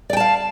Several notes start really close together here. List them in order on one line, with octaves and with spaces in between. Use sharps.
D5 G5 A5 F5